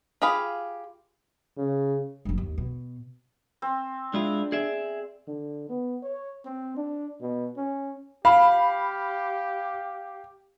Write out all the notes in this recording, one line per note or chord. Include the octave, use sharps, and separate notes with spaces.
F4 G4 G#4 F5 B5
C#3
F#1 G2
D#2
B2
C4
G#3 D4 E4 F4
G#4 D5 E5
D3
B3
C#5
C4
D4
B2
C#4
G4 F5 B5